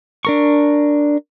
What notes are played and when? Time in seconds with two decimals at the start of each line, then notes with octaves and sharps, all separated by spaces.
0.25 D4 A#4 C#6